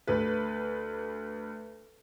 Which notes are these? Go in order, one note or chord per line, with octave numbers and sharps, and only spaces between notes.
D2 B4